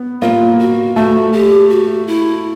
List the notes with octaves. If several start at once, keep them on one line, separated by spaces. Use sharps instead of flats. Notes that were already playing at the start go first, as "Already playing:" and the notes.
Already playing: B3
A#3 F4
F#4
A3 F#4
G4
F#4
E4